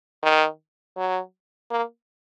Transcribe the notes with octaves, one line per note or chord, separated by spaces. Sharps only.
D#3
F#3
A#3